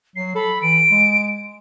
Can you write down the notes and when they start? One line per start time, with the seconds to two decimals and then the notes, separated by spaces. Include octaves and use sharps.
0.16 F#3 C7
0.35 A4 B5
0.62 E3 D7
0.90 G#3